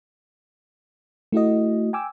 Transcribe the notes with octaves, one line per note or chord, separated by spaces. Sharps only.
A3 E4 F#4 D#5
G5 G#5 D6 E6